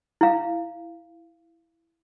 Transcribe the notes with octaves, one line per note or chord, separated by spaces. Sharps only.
E4 F5